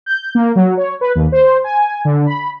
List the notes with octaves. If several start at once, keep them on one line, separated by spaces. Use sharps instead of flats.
G6
A#3
F#3
C#5
B4
D#2
C5
G#5
D3
B5